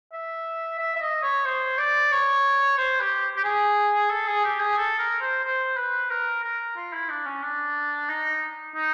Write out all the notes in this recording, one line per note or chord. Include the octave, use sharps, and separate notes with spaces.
E5
E5
E5
D#5
C#5
C5
D5
C#5
C5
G4
G4
G#4
A4
G#4
G4
G#4
A4
A#4
C5
C5
B4
A#4
A#4
F4
E4
D4
C#4
D4
D#4
D#4